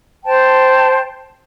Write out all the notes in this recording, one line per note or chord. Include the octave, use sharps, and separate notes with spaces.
C5 G5 A5